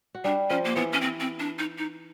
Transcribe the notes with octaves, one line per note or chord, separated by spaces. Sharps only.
F#4
G3 D4 G4
F3 C#4 F4
A#3
E3 B3 E4
C#4
C4
C4
D4
D#4
D#4